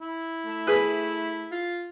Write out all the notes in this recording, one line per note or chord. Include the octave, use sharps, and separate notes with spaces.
E4
A3
G#4 B4
F4